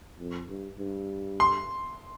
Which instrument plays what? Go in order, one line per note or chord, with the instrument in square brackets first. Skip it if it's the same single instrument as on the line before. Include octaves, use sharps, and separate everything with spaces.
[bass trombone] F2
G2
G2
[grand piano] C6